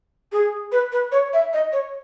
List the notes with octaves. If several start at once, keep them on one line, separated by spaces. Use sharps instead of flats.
G#4
B4
B4
C#5
E5
D#5
C#5